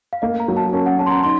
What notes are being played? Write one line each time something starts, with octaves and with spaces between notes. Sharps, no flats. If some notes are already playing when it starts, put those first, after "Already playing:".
F5
A#3 D#5
A#5
F#3
A5
C#4 A#4
F#5
C#4 A5
C6
A#5
D#4 C6